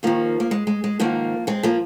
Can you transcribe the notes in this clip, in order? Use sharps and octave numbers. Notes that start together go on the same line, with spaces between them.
D#2 D#3 F3 A#3
A#3
G#3
G#3
G#3
G#2 D#3 F3 A#3
G#3 C4
F3 A#3